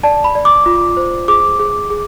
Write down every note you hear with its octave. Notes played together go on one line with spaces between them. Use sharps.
D5 A5
B5
D5
D6
F4
C5
G#4 D6
G#4
G#4